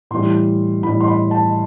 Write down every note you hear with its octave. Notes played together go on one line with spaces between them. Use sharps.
A2 E3 G3 C6
A2 E3 G3 B5
C6
B5
A5